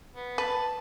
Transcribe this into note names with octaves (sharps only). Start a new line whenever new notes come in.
B3
B4 A5